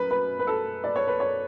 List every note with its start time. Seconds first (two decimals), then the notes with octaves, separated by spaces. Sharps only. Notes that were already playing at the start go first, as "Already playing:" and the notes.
Already playing: F#2 B4
0.11 B4
0.39 B4
0.47 A4
0.84 D5
0.96 C#5
1.08 B4
1.20 C#5